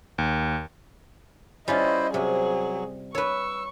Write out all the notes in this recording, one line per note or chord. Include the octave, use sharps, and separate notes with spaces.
D#2
G3 C#4 E4 F4 C5 D#5
C3 F#3 G#4
B4 C#5 C#6 E6